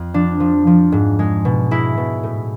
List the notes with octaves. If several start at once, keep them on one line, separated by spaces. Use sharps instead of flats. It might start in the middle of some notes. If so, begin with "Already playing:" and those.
Already playing: F2
F3 D4
F3
F3
G#2
G#3
B2
G#3 E4
B2
A2